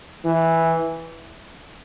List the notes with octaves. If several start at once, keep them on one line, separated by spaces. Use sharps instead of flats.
E3